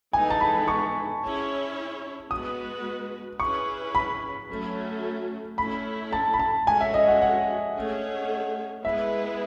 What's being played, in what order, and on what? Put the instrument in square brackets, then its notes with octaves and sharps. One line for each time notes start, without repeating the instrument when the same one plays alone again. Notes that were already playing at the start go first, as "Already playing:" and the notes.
[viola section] E3 G#3 B3 D#4 A4 [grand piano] G#5
[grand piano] A5
B5
C#6
[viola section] C#4 E4 G#4 C#5
[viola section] G#3 B3 F#4 B4 [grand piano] D#6
[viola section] C#4 E4 G#4 B4 [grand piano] C#6
[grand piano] B5
[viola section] F#3 A3 C#4 F#4
[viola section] A3 C#4 E4 [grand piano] B5
[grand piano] A5
B5
A5
[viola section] G#3 C#4 F#4 A4 C#5 [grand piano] G#5
[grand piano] E5
D#5
F#5
F#5
[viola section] A3 C#4 G#4 C#5
[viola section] G#3 B3 E4 G#4 B4 [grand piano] E5